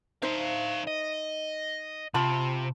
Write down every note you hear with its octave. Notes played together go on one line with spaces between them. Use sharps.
D4 D#4 C5 E5 F5
D#5
C3 F4 A5 B5